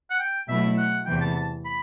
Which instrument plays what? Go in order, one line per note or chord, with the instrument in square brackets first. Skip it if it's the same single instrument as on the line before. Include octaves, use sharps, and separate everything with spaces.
[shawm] F#5
G5
[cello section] B2 F#3 A3 E4 [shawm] E5
[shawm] F#5
[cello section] E2 C3 E3 [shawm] G5
[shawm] G5
A5
A5
B5